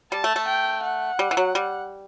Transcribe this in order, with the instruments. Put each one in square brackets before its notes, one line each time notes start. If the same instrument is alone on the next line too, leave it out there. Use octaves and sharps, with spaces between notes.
[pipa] G3 [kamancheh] A5
[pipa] A3
A3
[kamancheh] G5
F#5
[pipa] G3
E3
F#3
G3